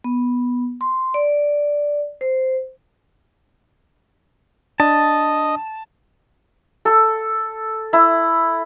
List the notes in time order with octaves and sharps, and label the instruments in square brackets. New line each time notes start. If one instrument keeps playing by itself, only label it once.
[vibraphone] B3
C6
D5
C5
[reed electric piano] D4 [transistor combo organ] D#5 [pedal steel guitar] A5
[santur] A4
E4